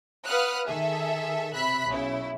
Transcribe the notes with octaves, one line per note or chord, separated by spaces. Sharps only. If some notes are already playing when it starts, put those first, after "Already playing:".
B4 F5 F#5 D#6 F6 F#6
D#3 G#4 A4 E5
C3 E5 B5 F#6 B6
B1 C#3 E4